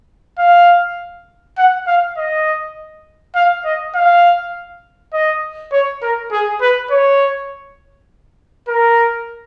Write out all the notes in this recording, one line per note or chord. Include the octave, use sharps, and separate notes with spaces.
F5
F#5
F5
D#5
F5
D#5
F5
D#5
C#5
A#4
G#4
B4
C#5
A#4